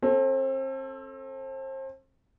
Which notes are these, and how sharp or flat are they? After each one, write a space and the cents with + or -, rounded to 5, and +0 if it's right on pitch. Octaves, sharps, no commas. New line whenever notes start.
C4 +35 A4 +0